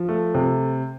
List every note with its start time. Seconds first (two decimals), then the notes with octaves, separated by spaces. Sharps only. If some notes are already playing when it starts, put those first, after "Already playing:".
Already playing: F3
0.09 A3
0.35 C3